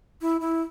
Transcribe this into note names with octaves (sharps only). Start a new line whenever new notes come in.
E4
E4